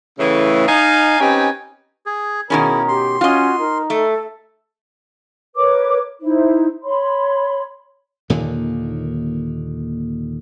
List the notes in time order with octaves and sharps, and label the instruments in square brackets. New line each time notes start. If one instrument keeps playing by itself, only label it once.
[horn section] A2 C#3 E3
D#4 F5 G#5
C4 C#4 D#4 G4 B4 G#5
[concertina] G#4
[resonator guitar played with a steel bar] B2 D#3 C#4 [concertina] E4 [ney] G#4 [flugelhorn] A#4
[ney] G4 [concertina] C6
[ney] C#4 [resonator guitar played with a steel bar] F4 D#5 [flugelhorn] F#4
[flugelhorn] D#4 [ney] A#4
[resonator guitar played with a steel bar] A3 [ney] A4
[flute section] A#4 B4 C#5 D6
D#4 E4 C5
C#5 B5 C6
[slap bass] D#2 A#2 D3 D#3